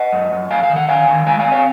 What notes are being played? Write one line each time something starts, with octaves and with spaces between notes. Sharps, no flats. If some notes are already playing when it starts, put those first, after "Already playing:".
Already playing: D#5 F#5
F#2
F#2
F#2 F5 G#5
F5
D#3
F#5
D#3 F5 G#5
D#3
G#3 F5 G#5
F5 G#5
C4
C#5 F5